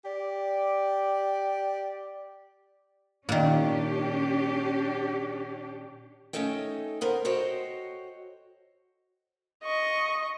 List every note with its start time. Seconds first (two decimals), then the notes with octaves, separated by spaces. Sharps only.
0.05 G4 D5
3.29 A#2 D#3 C#4 D4 G4
6.33 A3 C#4 D#4 A4 D#5 G5
7.01 D#3 B3 A#4 C5
7.25 F#4 A4 C5 C#5 D#5 G5
9.64 D#5 C#6